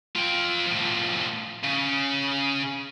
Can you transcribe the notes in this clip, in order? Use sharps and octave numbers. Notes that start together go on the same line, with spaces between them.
F4 G5
A2 F3
C#3